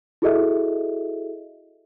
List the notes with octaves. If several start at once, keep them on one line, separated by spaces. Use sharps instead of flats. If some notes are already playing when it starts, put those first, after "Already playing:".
E4 F#4 G#4 A4 D#5 E5